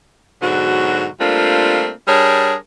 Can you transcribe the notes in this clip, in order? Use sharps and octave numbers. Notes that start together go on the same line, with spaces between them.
G#2 B2 D3 F#3 F#4
G3 A3 A#3 C4 D4 F4
G3 D4 G#4 A#4 C#5